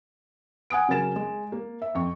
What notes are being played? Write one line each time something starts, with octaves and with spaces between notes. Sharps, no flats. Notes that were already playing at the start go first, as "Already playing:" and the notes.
F#5 G#5 D#6 D7
C#3 F#3 A#4 G#5 A6 E7
G#3
A#3
E5
F2 C#6